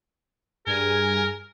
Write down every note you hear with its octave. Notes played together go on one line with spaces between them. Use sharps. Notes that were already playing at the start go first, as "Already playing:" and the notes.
G2 G#4 A#4 G#5 G#6